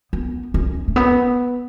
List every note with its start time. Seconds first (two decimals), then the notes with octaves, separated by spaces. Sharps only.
0.13 B3
0.54 C#4
0.88 A3
0.96 B3